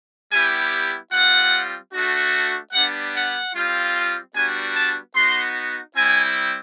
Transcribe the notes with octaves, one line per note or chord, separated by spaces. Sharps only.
G3 B3 E4 G4 G#5
G3 C4 F4 F#5
A3 D4 F#4
G3 B3 D4 F#5
F#5
G3 C4 F4
G3 B3 D4 F#4 G#5
A5
B3 D#4 F#4 C6
G3 C4 E4 G#5